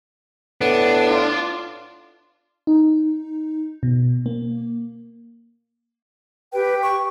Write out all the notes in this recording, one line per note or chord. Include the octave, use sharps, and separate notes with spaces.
A2 B3 D4
F4
D#4
B2
A#3
G4 B4 G5
C#6